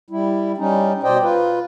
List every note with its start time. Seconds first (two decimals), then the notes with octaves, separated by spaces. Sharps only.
0.10 G3 E4
0.58 G3 C#4 D#4
1.03 B2 C5 D5 D#5 G5
1.23 F4 B4